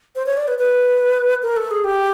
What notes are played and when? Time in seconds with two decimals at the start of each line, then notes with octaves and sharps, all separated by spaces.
0.16 C5
0.26 C#5
0.37 D5
0.48 B4
0.59 B4
1.43 A#4
1.57 A4
1.71 G#4
1.84 G4